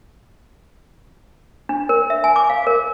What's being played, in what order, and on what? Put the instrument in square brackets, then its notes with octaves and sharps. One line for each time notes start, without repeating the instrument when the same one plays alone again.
[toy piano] D4
A#4
E5
G#5
D6
F5
A#4